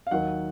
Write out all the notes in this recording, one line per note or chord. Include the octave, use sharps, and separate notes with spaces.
F5
D#2 D#3 F#3 F#5